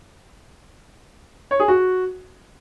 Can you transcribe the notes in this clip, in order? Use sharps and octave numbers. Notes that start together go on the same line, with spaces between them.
C#5
G#4
F#4